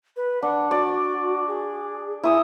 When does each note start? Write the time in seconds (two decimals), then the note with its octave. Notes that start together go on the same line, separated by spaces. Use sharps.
0.17 B4
0.42 D4 F#5
0.71 F#4 D5
1.47 G#4
2.23 E4 G#5 D#6 E6